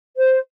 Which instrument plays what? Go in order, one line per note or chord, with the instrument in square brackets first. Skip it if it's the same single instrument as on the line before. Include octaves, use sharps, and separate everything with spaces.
[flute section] C5